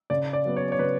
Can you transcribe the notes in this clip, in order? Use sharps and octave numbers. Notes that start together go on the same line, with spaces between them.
C#3 D5
D5
F#3 B3
C#5
C#5
C#3 B4